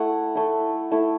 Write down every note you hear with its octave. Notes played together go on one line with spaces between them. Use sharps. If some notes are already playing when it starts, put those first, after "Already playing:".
Already playing: A3 E4 F#5
A3 E4
A3 E4